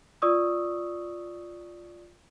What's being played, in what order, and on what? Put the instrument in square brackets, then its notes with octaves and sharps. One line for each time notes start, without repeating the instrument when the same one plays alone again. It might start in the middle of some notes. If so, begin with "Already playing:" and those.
[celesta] F4 D5 C#6 D#6 E6